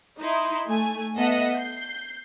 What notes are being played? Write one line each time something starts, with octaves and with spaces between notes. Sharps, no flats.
D#4 E4 C6
A3 G#5
B3 A4 D#5 E5 F#5
G6 C7